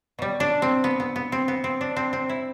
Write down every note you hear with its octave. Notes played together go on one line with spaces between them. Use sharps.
B2 G3
D4
C4
B3
B3
B3
C4
B3
C4
D4
C4
C4
E4